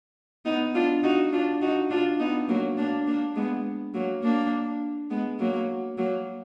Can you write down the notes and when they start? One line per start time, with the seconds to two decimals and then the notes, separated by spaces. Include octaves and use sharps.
0.45 B3 D#4
0.75 D4 F4
1.03 D#4 F#4
1.32 D4 F4
1.61 D#4 F#4
1.90 D4 F4
2.19 B3 D#4
2.48 F#3 A#3
2.77 A#3 D4
3.07 A#3 D4
3.36 G#3 B3
3.94 F#3 A#3
4.23 A#3 D4
5.10 G#3 B3
5.40 F#3 A#3
5.98 F#3 A#3